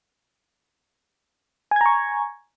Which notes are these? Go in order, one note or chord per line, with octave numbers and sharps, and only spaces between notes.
G#5 A#5 C#6 G#6